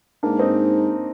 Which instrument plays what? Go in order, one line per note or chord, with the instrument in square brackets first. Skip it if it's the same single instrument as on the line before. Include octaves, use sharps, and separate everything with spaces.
[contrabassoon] G#2 [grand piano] A#3 D4
[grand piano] C4 D#4